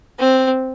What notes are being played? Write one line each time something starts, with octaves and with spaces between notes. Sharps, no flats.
C4